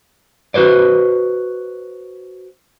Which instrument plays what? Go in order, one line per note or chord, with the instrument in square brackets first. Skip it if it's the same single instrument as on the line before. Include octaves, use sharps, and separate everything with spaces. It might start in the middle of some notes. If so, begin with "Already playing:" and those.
[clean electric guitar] F#4 B4 C5 D5